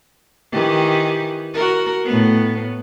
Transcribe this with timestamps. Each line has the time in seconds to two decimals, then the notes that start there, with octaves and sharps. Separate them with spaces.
0.52 D#3 E3 G4
1.54 F#4 A#4
2.05 A2 B3